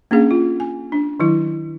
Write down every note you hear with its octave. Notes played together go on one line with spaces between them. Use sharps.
A#3 C#4 D4 G#4 F5
F4
G#5
D4
D#3 F#3 E4